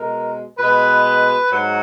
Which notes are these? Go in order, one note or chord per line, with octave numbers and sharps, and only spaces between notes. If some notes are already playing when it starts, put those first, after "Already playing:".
Already playing: B2 G#3 A#4
B2 G#3 B4
G#2 F#3